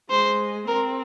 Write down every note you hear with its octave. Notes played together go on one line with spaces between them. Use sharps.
G#3 C5
C4 A#4